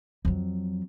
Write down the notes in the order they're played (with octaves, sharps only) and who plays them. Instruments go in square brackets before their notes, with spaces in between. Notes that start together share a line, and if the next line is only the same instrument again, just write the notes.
[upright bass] F2 F#3